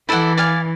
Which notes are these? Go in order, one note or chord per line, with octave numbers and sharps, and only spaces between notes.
E3 E4 A4 D5 F#5
D5 F5 G#5